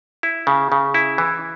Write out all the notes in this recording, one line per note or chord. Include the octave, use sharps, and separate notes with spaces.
E4
C#3
C#3
E4
E3